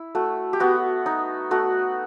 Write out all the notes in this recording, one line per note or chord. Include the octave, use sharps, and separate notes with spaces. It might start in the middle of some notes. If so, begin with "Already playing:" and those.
Already playing: E4
A3 F#4
G4
B3 F#4
D#4
A3 F#4